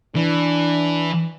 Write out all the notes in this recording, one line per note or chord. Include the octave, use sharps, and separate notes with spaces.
E3 D4